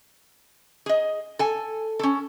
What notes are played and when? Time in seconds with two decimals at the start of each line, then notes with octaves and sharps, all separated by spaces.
0.86 G#4 D#5
1.39 A4 G#5
1.99 C#4 A4